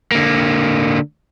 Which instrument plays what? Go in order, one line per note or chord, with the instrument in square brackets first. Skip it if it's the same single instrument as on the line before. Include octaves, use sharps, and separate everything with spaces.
[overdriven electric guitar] D3 A#3